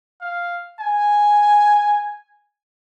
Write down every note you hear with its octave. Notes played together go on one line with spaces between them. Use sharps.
F5
G#5